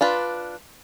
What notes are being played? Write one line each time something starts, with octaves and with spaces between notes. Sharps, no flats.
D4 F4 B4